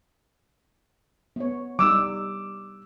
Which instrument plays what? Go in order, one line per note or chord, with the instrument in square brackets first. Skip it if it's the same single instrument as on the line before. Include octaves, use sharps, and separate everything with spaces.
[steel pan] B3 C#5
[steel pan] G3 D#4 [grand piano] D6 E6